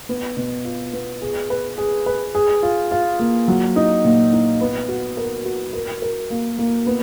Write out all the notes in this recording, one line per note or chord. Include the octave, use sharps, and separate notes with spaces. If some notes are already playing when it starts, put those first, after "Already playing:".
B3
B2
F4
B3
G#4
B4
G#4
B4
G#4
F4
F4
A#3
F#3
D#4
A#2
D#4
B3
F#4
A#4
F#4
A#4
A#4
A#3
A#3
B3